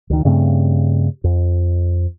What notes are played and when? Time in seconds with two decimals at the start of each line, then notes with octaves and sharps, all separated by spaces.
0.10 D2 D#3
0.25 G2 C#3 A3 C4
1.24 F2